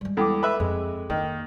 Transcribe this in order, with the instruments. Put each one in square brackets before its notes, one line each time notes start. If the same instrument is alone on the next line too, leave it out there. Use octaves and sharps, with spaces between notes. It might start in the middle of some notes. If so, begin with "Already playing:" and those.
[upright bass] G3 G#3
[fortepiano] E2 [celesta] A4 G5 D6
[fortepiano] B4 E5
[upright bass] F2 [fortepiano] G#3
[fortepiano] D#3 [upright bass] A#3